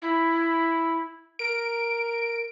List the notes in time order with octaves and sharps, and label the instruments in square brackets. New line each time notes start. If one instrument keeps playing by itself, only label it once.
[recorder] E4
[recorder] A#4 [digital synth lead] D7